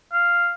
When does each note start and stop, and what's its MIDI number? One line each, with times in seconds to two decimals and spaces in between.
0.13 0.53 77